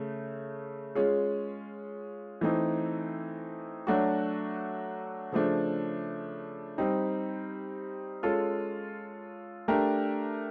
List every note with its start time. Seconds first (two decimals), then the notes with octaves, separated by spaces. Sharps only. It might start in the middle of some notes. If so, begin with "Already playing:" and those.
Already playing: C#3 A3
0.95 G#3 C#4 F4 G#4
2.41 E3 A3 C4 D#4
3.87 F#3 A3 D4 F#4
5.32 C#3 F3 A3 D4
6.78 G3 C4 D#4
8.23 G#3 C#4 F4 A4
9.68 A3 D4 G4 A#4